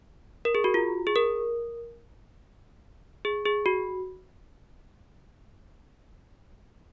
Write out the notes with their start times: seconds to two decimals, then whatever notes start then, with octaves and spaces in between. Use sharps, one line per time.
0.45 A#4
0.55 G#4
0.64 F#4
0.74 F4
1.07 G#4
1.16 A#4
3.25 G#4
3.45 G#4
3.66 F#4